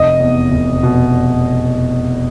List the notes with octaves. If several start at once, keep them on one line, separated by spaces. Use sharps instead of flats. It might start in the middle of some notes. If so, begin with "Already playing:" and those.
Already playing: F1 D#5
E2
F1
B2